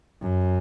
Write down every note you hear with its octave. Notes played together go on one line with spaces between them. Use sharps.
F#2